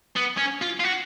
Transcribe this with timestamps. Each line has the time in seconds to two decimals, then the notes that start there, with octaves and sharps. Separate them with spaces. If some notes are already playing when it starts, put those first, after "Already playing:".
0.16 B3
0.38 C#4
0.62 F4
0.80 F4
0.84 F#4